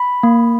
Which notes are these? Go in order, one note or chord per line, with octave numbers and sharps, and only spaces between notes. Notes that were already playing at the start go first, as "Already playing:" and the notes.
Already playing: B5
A#3